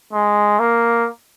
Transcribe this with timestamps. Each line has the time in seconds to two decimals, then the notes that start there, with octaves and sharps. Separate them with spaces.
0.13 G#3
0.60 A#3